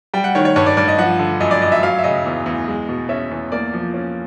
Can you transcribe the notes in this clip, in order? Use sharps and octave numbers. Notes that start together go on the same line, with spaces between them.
G3 G5
F#5
D#3 C#5
C#5
G2 C#5
D5
G2 D5
D#5
F3 F#5
D3
F#2 D#5
D5
F#2 D#5
E5
F#3 F5
E5
C#3 D#5
E2
E2
G#3
B2
C#4 E5
E2
A#3 D5
F3
C#4